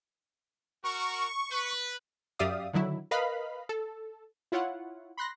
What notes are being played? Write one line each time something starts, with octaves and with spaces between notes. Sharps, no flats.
F#4 A#4 C#6
B4
F#2 G4 D5 E5 F5 D#6
D3 D#3 F#3 E4
A#4 B4 D#5 F5 B5
A4
E4 F4 C#5 F#5
B5 C6 F#6 A#6